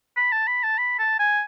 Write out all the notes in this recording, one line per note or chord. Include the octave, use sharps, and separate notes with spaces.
B5
A5
B5
A5
B5
A5
G#5